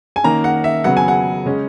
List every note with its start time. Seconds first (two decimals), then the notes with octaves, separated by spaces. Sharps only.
0.16 G#5
0.23 D#3 A#3 C#4 A#5
0.44 F#5
0.64 E5
0.84 C#3 F#3 B3 F#5
0.97 G#5
1.08 F#5
1.46 C#3 G#3 C#4